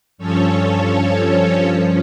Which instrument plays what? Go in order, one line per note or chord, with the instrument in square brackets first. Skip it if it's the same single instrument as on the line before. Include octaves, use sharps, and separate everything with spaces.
[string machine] G2 F3 C#4 A4 C#5